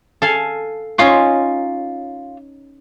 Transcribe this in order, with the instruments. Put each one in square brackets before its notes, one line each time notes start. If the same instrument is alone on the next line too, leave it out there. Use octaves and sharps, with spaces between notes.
[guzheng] A4 F5 G#5
[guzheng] C#4 D#4 C6 [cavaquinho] F4 C#6